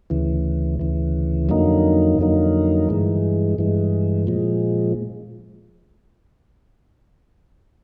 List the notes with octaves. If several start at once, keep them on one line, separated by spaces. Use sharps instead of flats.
D2 C#3 E3
D2 C#3 E3
F2 D3 F#3 A#3 D#4
F2 D3 F#3 A#3 D#4
G2 E3 G#3
G2 E3 G#3
A#2 F3 G#3